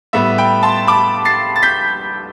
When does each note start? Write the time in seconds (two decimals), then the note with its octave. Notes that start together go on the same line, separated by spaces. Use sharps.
0.13 A2 G3 B3 E5
0.38 G5 B5
0.63 A5 C6
0.87 B5 D6
1.25 A6 C7
1.56 A6
1.63 G6 B6